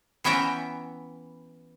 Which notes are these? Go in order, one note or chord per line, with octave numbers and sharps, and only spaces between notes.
E3 B3 C#4 E5 G5 A#5